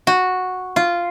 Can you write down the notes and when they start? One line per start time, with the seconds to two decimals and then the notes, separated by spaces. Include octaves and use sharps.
0.07 F#4
0.76 F4